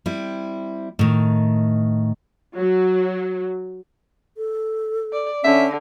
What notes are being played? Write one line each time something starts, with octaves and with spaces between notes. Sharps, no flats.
G3 C4 E4
A2 D#3
F#3
A4
D5
D3 C#4 E5